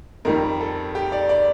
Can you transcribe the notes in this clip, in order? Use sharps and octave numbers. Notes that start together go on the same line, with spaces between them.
F2 D#3 G3 A#4
A4
G4
D5
D5